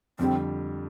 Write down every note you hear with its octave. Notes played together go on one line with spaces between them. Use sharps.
F2 D3 G3 C4